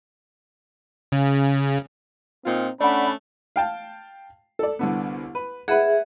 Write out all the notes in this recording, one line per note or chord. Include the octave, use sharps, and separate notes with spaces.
C#3
A#2 C4 D#4 F4
A3 C#4 D4 D5 F#5 B5
F5 G5 A5
A4 D5
C2 D3 B3
B4
G#4 B4 E5 F#5